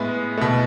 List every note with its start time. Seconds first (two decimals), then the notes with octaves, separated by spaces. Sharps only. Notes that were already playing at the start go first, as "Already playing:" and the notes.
Already playing: A2 G#3 B3 E4
0.37 B2 A3